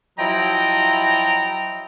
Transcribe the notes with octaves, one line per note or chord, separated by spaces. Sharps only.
F3 F#3 E4 D#5 G5 A#5